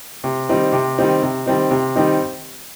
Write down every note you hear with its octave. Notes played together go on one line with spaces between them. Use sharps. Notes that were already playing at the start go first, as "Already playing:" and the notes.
C3
D#3 G3 C4 D#4
C3
D#3 G3 C4 D#4
C3
D#3 G3 C4 D#4
C3
D#3 G3 C4 D#4